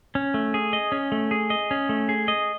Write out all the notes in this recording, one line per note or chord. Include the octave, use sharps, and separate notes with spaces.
C#4
A3
G#4
D#5
C#4
A3
G#4
D#5
C#4
A3
G#4
D#5